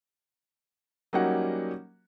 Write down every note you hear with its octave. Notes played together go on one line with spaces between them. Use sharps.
F#3 G3 A#3 C#4 D#4 F#5